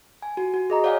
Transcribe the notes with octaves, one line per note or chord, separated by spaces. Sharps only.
G#5
F#4
F#4
G#4 D#5 A#5
C#5 D5 F5 F#5 G#5